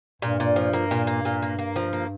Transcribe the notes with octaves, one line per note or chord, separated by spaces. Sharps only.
G2 A#2
A#2
F3
A#3
A#2
A#3
A#2
A#3
A#3
F3
A#3